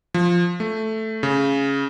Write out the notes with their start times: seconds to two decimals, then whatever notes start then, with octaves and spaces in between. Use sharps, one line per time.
0.14 F3
0.60 A3
1.23 C#3